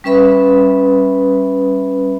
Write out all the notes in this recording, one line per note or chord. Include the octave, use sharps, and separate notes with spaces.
G3 C#4 B4 E5 B5